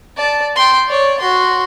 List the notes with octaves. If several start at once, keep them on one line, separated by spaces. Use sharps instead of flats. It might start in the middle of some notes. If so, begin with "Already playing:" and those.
D5 A5
G5 C6
C#5 D5
F#4 C6